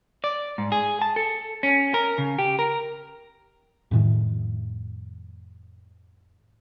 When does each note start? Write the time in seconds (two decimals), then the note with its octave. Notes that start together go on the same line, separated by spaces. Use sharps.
0.24 D5
0.58 G#2
0.72 G#4
1.01 A5
1.16 A4
1.63 C#4
1.94 A#4
2.18 C#3
2.39 G4
2.59 A#4
3.91 F2 A2 D#3